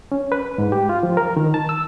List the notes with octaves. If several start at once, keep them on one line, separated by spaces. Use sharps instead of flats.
C#4
B4
G#2
G4
F4
F3
A#4
D#3
A5
E6